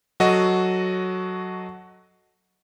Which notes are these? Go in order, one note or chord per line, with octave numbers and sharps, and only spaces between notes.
F#3 F#4 A4 D#5